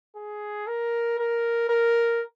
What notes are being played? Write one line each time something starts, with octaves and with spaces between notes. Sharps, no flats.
G#4
A#4
A#4
A#4